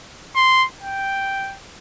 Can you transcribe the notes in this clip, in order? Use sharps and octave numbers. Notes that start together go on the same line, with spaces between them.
C6
G5